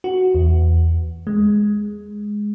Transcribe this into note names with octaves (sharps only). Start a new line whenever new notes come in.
F#4
E2
G#3